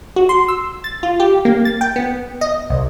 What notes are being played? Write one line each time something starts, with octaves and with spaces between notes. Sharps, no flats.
F#4
C6
E6
A6
F4
G4
A#3
A6
G5
B3
D#5
C2